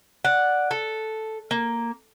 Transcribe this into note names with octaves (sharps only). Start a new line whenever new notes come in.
D5 F#5
A4
A#3